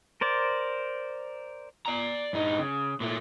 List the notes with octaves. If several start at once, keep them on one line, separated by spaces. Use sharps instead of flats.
A#4 C5 D5
D5 A#5
G2 D#4
C#3
A#2 A3